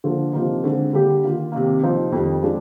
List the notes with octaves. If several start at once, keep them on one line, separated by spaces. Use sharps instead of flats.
D3 F3 A#3
C3 F3 A#3 D#4
D3 G#3 C4
D3 G3 A#3 D4 G4
D#3 A#3 F4
C3 D#3 A#3
C3 F3 A#3 D#4
F2 D#3 G3
F3 G#3 D4